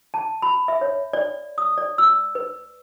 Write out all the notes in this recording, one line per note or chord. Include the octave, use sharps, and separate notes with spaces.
A5
B5
E5
C#5
D5
D#6
D5
E6
B4